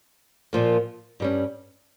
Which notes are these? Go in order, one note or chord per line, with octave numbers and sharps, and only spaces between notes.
A#2 F3 A#3
G2 G3 C#4